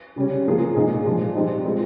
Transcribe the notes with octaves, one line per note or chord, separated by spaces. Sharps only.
C#3 G3 C#4
F3 A#3 F4 G#4
A#2 G#3 D#4 G#4
A#2 F3 G#3
G3 C4 D#4
G#3 C4 F4